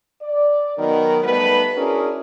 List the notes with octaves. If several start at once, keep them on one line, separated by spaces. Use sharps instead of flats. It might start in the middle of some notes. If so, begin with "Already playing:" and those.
D5
D#3 F#3 B3 D#4 A#4
G3 A3 B3 D#4 B4
C#4 D4 E4 F#4 G#4 A#4